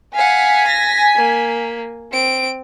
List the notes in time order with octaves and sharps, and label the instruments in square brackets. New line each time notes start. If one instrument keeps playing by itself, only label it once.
[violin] F5 F#5 [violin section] G#5 B6
[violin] A#6
A#3
C4 D7